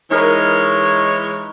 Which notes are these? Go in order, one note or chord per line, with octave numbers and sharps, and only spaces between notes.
E3 G#3 D#4 A#4 B4 C#5